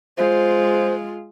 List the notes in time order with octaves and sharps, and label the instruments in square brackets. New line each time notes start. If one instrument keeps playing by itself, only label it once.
[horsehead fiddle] G#3 F4 [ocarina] C5